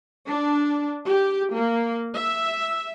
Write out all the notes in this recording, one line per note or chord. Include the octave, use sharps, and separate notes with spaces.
D4
G4
A#3
E5